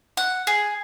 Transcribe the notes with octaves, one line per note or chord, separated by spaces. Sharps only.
F#5
G#4